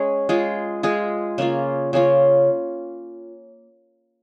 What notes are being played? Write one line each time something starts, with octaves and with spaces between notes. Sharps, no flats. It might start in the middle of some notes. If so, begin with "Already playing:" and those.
Already playing: G#3 C#4 G#4
G#3 F4 G#4
G#3 F4 G#4
C#3 A#3 C#4 F4
C#3 A#3 C#4 F4